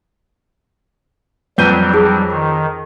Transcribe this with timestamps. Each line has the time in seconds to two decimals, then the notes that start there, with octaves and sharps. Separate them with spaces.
1.58 F2 F#3 G3 B4 G6 D#7
1.93 F#3 G3 D#4 G#4
2.32 D#3